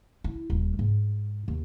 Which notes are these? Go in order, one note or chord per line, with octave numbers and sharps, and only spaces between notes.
E4
D#1
G#2
D#2